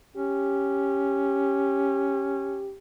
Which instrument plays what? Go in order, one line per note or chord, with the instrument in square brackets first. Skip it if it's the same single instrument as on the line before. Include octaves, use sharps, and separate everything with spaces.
[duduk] C#4 [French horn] G4